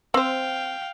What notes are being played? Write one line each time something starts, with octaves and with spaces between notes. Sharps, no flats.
C4 C5 F5 G5